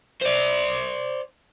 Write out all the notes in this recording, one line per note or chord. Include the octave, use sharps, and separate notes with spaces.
C5 D5